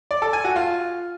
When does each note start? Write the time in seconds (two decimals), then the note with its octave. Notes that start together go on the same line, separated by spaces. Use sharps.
0.11 D5
0.22 A4
0.33 G#5
0.45 F#4
0.56 F4